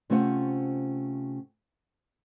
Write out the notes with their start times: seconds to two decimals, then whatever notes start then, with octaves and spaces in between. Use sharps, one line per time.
0.10 C3 A3 C#4 F4 C5 F#5